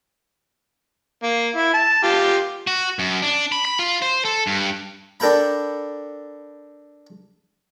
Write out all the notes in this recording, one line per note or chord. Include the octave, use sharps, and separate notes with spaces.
A#3
E4
A5
F4 G4
F#4
F#2
D4
B5
B5
F4
C5
A4
G2
D4 A4 A#4 G5 B5